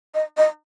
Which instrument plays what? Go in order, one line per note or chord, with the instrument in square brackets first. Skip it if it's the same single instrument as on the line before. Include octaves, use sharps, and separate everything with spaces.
[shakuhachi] D#5
D#5